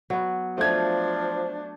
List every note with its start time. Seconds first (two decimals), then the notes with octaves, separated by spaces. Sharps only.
0.10 F#3 B3
0.58 F3 A3 D4 G#6